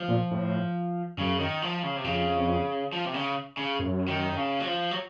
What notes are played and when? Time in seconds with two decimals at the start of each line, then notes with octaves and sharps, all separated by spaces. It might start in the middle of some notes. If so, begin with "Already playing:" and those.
Already playing: F3
0.08 A#2
0.31 A2
1.18 F#2 C#3
1.40 D#3
1.62 F3
1.83 C#3
1.96 C3
2.04 F2 C#3
2.92 F3
3.05 C3
3.14 C#3
3.57 C#3
3.79 F#2
4.08 D#3
4.37 C#3
4.60 F#3
4.67 F3
4.91 F#3